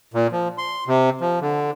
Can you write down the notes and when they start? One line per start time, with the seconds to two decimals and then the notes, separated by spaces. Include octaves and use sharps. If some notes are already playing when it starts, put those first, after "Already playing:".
0.14 A#2
0.32 F3
0.58 C6
0.87 C3
1.21 F3
1.42 D3